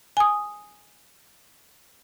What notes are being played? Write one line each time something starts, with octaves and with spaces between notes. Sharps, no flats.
G#5 D#6